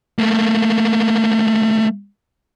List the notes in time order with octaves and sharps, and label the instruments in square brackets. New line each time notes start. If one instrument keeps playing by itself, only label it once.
[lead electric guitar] A3 A#3